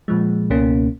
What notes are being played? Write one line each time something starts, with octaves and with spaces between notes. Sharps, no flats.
A#2 F3 G#3
C#2 B2 A#3 C#4